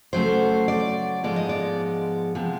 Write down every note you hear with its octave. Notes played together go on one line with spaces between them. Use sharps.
C#3 F#3 A3 C5
D5
G#2 F3 G#3 B3 D5
D#5
D5
C3 F3 G#3 B3